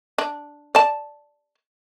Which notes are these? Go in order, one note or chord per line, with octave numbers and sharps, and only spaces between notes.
D4
D5 A5